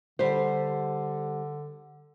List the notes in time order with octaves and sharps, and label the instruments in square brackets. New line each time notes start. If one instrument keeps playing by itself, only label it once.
[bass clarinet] D3 [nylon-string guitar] G3 C5